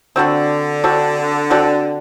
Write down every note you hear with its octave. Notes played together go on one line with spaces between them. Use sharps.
D3 C4 F#4 A4 D5
C4 F#4 A4 D5
C4 F#4 A4 D5